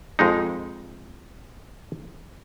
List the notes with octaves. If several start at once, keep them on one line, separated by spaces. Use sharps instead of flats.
F2 G#3 D#4